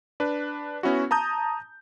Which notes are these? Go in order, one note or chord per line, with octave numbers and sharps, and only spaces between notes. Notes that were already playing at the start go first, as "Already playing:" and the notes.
D4 B4
B3 C#4 E4 F#4
A5 A#5 D#6 G6